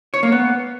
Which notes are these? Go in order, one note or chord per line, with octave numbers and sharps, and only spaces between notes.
C#5
A#3
B3